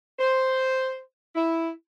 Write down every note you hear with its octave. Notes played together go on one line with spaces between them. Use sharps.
C5
E4